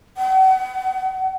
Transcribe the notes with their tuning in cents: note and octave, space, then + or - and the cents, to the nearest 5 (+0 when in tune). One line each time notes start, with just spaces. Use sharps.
F#5 +35